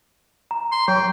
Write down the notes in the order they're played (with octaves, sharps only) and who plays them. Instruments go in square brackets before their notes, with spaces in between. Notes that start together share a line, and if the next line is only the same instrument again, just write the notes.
[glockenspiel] A#5
[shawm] C6
[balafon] F#3 [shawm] G5